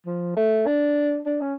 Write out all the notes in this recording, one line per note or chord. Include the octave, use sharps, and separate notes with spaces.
F3
A3
D4
D4
C#4